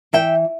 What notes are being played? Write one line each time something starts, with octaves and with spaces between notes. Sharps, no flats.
E3 E5 G5